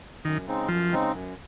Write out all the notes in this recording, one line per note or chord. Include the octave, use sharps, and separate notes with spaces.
F#2 D#3
C#3 G#3 C4 D#4
F#2 F3
C#3 G#3 C4 D#4
F#2